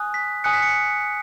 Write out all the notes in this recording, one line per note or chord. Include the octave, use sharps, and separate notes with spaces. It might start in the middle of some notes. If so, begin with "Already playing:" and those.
Already playing: G#5 D#6 F#6
B6
G#5 D#6 F#6 C#7
B6
C#7